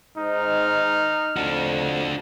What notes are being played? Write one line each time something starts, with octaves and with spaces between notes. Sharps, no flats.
G#2 D#4 F6
F2 D4 F#4